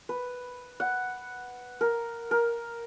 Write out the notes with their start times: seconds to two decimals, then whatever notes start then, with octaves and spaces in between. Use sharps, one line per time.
0.09 B4
0.80 F#5
1.81 A#4
2.31 A#4